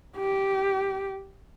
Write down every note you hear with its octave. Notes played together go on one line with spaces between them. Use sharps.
G4